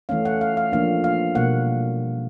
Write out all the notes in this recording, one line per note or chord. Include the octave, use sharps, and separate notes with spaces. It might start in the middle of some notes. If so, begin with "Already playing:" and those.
E3 A3 C#4 F5
F#5
F5
F5
F3 A#3 D4 F5
F5
B2 G3 A#3 F#5